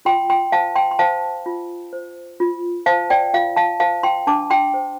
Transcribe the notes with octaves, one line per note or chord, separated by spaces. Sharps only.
F4 G5 C6
G5 C6
C5 F5 A5
G5 C6
C6
C5 F5 A5
F4
C5
F4
C5 F5 A5
D5 G5
F4 F5
F5 A5
C5 F5 A5
G5 C6
D4 A5 D6
G5 C6
C5